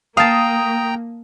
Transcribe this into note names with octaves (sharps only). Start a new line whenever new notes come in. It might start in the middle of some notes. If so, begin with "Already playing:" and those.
A#3 F5 G5 A5 A#5 D#6